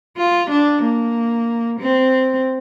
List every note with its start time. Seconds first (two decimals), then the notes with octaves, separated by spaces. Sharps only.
0.18 F4
0.51 D4
0.83 A#3
1.80 C4